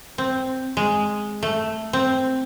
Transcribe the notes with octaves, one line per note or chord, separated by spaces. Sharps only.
C4
G#3
A3
C4